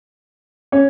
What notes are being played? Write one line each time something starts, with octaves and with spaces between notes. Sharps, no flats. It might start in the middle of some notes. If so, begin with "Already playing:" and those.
C#4